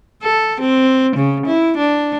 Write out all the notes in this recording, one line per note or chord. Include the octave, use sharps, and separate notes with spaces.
A4
C4
C#3
E4
D4